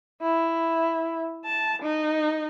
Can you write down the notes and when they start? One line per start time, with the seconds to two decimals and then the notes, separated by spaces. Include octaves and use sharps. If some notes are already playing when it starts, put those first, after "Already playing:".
0.21 E4
1.45 A5
1.82 D#4